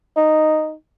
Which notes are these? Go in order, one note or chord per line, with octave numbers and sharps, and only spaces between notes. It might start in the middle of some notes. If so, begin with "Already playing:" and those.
D#4